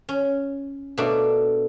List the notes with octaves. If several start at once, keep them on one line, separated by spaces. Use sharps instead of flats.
C#4
B2 A3 A#3 D4 F#4